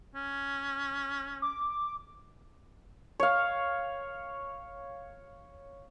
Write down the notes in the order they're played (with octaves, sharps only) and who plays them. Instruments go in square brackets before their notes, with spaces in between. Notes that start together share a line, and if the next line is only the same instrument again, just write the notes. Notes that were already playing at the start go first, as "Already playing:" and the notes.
[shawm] C#4
[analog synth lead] D6
[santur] C#5 F5